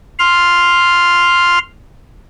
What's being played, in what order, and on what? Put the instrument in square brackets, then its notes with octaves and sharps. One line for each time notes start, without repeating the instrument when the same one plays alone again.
[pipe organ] C6 F6